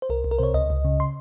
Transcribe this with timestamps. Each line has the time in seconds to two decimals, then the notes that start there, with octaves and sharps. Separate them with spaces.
0.02 C5
0.09 C2 A#4
0.24 C2
0.31 A#4
0.39 C3 C5 C#5
0.54 C#2 D#5
0.70 C#2
0.84 C#3
1.00 C6